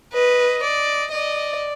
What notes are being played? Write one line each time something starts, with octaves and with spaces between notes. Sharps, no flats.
B4 D#5
D5
D5 D#5